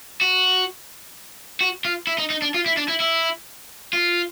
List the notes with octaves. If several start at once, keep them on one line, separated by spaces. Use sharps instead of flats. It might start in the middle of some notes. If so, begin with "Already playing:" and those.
F#4
F#4
F4
E4
D#4
D#4
D4
F4
E4
D4
E4
E4
F4